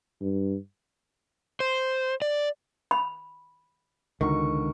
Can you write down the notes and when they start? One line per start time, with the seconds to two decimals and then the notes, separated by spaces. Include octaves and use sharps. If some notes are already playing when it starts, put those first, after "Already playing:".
0.21 G2
1.60 C5
2.22 D5
2.91 B5
4.21 C#2 B2 D3 D#3 A#4 C#6